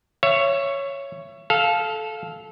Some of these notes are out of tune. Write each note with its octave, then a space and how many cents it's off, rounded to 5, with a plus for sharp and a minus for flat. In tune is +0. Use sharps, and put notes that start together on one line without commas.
C#5 +0 E5 +30
A4 -20 F5 +0